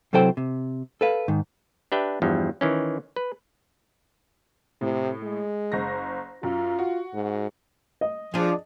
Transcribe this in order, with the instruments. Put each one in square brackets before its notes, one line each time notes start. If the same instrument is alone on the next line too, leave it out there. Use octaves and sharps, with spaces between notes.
[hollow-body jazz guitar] C3 F#3 E4 A4 C5 G5
C3
A4 B4 F5
G#2 D#3
[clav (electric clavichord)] D4 G4 B4 E5 G5
E2 G2 F3
D#3 E3 C#4
B4
[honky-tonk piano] A2 [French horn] C3
[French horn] G#3
[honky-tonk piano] F#1 A#6
[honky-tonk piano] F#2 [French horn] F4
[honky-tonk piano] F#4
[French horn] G#2
[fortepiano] D#5
[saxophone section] F3 [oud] D4 G#4